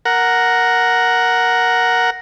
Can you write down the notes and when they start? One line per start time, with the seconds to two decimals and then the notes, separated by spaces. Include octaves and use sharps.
0.05 A#4 F#5